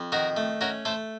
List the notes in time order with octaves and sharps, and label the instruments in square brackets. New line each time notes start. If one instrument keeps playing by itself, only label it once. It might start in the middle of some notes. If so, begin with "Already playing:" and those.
Already playing: [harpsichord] F2
D#3 F#4 A#4
A3
C#4 F#4 A#4
A3 A4 C5